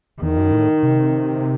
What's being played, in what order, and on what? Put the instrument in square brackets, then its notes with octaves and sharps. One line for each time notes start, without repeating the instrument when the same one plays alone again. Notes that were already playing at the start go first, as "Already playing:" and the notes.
[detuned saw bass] E2 [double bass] D#3
[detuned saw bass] F#2
A2
C3